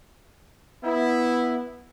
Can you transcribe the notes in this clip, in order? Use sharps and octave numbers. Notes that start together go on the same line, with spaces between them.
B3 E4